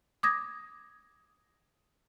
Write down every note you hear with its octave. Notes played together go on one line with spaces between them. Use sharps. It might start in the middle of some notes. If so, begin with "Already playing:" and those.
D6 D#6 G#6 A#6